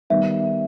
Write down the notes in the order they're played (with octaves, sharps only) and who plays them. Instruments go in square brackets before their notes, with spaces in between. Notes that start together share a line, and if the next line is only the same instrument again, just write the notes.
[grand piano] D#3 G3 B3 [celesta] E5